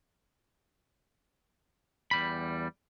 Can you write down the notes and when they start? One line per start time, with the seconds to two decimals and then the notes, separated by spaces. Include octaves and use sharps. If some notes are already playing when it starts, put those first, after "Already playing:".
2.11 E2 G3 B5